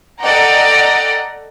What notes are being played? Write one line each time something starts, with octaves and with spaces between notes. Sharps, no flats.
A4 D5 D#5 F#5 G5 A#5